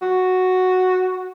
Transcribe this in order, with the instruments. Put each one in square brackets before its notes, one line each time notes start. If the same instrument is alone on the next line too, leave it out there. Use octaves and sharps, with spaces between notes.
[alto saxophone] F#4